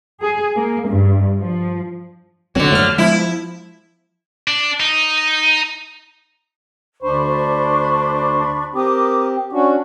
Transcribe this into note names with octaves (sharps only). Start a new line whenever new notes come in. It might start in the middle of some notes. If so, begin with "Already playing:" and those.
G#4
A#3
G2
F3
D1 B1 D3 F#3 C4
F#2 F3 A3 F6
F3 G#3 B3 E4
D4
D#4
D2 D4 C5 B5 C#6
C4 G4 A#4 D6 D#6
C#4 D4 F#4 C#6